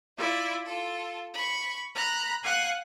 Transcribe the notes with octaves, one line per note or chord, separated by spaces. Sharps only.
E4 F4 D5
F4 A4
B5 C#6
A#5 B5 F#6
F5 F#5 G#5 F#6